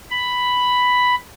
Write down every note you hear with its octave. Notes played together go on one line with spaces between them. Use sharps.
B5